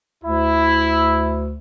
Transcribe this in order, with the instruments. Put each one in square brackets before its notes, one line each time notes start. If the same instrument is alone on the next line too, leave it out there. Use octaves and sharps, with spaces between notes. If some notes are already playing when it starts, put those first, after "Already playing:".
[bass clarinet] D2 [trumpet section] E4